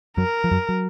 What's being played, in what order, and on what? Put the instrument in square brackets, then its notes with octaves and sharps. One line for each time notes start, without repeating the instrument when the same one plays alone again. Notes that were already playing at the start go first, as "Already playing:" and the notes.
[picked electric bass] F#2 F#3 [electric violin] A#4
[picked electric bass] F3
F#2 F#3
F#3